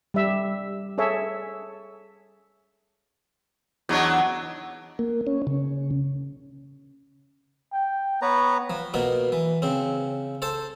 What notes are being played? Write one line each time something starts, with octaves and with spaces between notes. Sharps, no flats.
G3 E5
G#4 A4 C#5 E5
E2 F#3 B3 D4 D#4 C#5
A#3
C#4
C#3
G5
B3 B4 C#5 A#5
F3
B2 F3 A#3 B3
E3
C#3 C4
A4 C5 A5